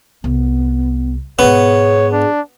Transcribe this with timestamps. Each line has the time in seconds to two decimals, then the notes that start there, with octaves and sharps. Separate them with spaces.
0.24 C2 B3
1.39 G#2 B2 B3 G#4 C#5
2.12 D4